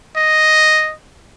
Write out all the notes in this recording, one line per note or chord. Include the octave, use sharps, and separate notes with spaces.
D#5